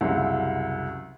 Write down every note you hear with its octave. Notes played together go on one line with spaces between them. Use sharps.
C2 F#2 C#3